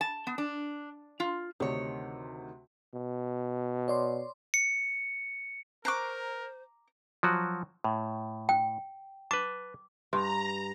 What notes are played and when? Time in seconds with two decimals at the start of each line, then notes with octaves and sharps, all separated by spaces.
0.01 A5
0.27 B3
0.38 D4
1.20 F4
1.60 D2 C3 D#3 C#5
2.94 B2
3.88 C#5 D5 C6
4.54 C#7
5.85 A#4 C5 A#5 C#6 D6 F#6 C7
7.23 F3 F#3 F#4
7.84 A2
8.49 G5
9.31 B4 A5 D6
10.13 G2 A#5 C6